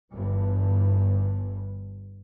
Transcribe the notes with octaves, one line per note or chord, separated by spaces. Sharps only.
G1 G2 E3